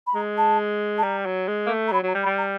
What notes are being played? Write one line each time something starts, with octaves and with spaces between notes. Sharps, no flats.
B5
G#3 A#5
A5
A5
G3 A#5
F#3
G#3
A#3
A3
A#5
F#3 B5
F#3 A#5
G3
B5
G3
A#5